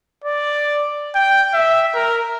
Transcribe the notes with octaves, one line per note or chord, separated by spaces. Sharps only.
D5
G5
E5
A#4